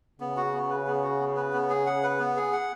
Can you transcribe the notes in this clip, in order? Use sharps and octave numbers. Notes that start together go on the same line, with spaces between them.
C#3 B3
F#4
B3
B4
B3
F#4
B3
B4
B3
G#4
F#5
B4
B3
G#4
F#5